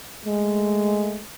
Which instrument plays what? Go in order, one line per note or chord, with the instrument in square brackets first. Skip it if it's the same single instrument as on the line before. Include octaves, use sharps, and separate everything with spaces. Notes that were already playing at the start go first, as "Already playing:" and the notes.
[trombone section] G#3 A3